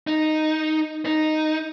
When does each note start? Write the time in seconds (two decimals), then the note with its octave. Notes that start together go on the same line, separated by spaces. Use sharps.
0.07 D#4
1.05 D#4